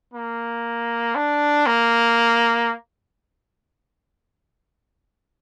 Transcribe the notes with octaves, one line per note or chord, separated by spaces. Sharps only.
A#3
D4
A#3